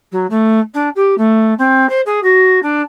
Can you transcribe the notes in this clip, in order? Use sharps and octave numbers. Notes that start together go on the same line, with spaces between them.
F#3
A3
D4
G4
A3
C4
C5
G#4
F#4
D4